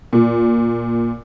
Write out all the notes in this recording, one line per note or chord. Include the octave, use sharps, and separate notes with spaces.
A#2